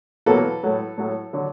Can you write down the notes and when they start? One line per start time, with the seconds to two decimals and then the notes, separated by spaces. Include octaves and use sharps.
0.26 E2 B2 F#3 A#3 A4 B4
0.63 A2 F#3 A3
0.98 A2 F#3 A3
1.33 D3 F#3